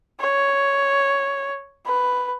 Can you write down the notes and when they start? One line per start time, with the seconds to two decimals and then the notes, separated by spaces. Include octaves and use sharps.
0.20 C#5
1.86 B4